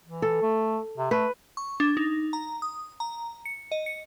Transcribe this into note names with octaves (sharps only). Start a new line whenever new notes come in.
E3
A4
A3
C3
A3 B4
C#6
D4
D#4
A#5
D#6
A#5
C#7
D#5
C#7